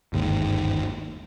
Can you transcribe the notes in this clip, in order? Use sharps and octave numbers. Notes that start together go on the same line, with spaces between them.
G1 D#2 G#2